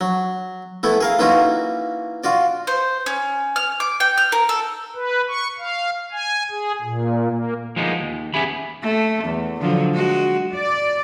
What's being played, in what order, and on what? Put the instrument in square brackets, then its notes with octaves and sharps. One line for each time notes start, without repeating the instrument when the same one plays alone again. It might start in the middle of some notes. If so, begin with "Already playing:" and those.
[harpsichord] F#3
E3 A3 B3 E4
G#4 A#4 F5
E3 A#3 C#4 D#4 F4 F#4
F4 F#4 D5
[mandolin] C5
C#4
F6
D6
G5
F6
A#4
A4
[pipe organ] B4
C#6
F5
G#5
G#4
A#2
A#3
[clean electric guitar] F3 G#3 A#3 B3 C#4 D#4
D#2
B3 C#4 G4 G#4 E5 B5
[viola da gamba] A3
E2
D3 F3 F#3
G#3 F#4
[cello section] D5